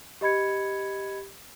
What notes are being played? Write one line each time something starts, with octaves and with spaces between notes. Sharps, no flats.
G4 D#5 B5 G#6 C#7